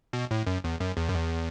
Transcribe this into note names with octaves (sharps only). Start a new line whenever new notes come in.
B2
A2
F#2
E2
F#2
E2
F#2
E2